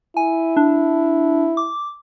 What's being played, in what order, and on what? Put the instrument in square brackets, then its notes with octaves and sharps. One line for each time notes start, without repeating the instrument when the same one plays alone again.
[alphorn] E4 [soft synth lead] G#5
[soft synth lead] D4
D6